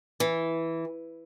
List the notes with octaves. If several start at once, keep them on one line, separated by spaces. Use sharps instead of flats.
E3